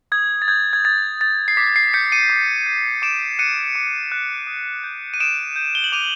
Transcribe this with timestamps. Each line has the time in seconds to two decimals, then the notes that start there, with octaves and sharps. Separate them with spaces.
0.12 D#6 G#6
0.42 A6
0.48 G6 G#6
0.73 G#6
0.85 D#6 A6
1.21 G6 A6
1.48 C7
1.57 D6 B6
1.76 C7
1.94 G6 B6 C#7
2.12 C#7 D#7
2.29 D6
2.67 G6
3.02 D6 D7 E7
3.39 F#6 C#7 D#7
3.75 D6
4.12 F#6
4.47 D#6
4.84 G6
5.14 D#7
5.20 D#6 D7 E7
5.56 G6
5.75 G7
5.84 F#7
5.92 D6 D#7 F7